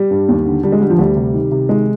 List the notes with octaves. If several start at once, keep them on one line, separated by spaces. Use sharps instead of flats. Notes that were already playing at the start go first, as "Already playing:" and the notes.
Already playing: G3
G2
D#2
D3
D3 G3
G#3
D3 G3
F3
D2 G3
C3
D#3
C3
D#3 G#3